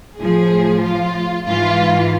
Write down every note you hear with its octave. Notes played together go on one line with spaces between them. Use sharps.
A2 F3 G#4
F4
G#2 E3 F4